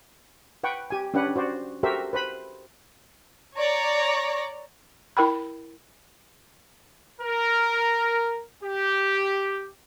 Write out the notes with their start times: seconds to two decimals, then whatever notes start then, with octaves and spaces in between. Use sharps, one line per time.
0.63 B4 F#5 G5 C#6
0.90 G4 G#5
1.14 C#4 D4 G4 B4 F#5
1.36 F#4 C5 D5
1.83 F#4 G4 A4 A#4 C5 E5
2.13 B4 C5 B5
3.56 C#5 D5 A#5
5.17 E4 A#4 G5 B5
7.21 A#4
8.64 G4